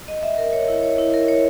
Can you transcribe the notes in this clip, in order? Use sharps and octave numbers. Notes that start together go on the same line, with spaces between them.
D#5
E5
A#4
C#5
E4
C#5
E4
A#4
C#5